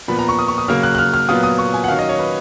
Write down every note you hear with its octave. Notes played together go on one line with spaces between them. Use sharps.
A#2 F3 B3 B5
A#5
C#6
D#6
C#6
D#6
C#3 F#3 A#3 F6
F#6
F#6
F6
F6
A#2 F#3 B3 F4 D#6
D#6
C#6
G#5
F#5
D#3 F#3 C#4 F5
D#5
C#5
B4